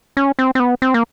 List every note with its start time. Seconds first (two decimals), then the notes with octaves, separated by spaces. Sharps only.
0.17 C#4
0.39 C4
0.55 C4
0.60 B3
0.82 C4
0.94 A#3